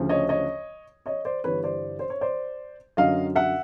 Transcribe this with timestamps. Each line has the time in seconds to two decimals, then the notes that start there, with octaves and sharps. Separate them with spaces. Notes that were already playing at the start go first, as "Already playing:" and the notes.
Already playing: D2 C#3 F3
0.09 C#5 D#5
0.29 C#5 D#5
1.06 C#5 D#5
1.25 C5 D5
1.44 G1 G2 E3 G3 B4 C#5
1.64 C5 D5
1.99 C5
2.10 C#5
2.21 C5 D5
2.97 F#2 D3 F#3 D#5 F5
3.36 E5 F#5